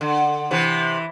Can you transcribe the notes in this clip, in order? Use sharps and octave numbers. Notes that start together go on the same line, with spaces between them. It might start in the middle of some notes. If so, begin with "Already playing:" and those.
D3
C3 E3